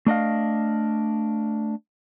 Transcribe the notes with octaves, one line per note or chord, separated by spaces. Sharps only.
A3 D4 D#5 F5